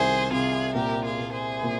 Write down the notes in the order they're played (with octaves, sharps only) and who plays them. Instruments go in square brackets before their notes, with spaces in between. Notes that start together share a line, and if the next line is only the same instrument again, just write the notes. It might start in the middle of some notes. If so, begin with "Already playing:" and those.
Already playing: [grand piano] C2 D#3 [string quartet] G#4 C5
[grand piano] C3 [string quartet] F4 G#4
[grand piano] A#2 [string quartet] G4 A#4
[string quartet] F4 G#4
[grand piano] A#2
[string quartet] G#4 C5
[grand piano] A#2